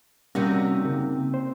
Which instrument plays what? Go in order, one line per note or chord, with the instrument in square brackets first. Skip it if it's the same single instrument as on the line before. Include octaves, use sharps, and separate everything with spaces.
[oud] C3 D#4 F#4 [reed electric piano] G3 A#3 C#4
[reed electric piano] C#3 A#3
C5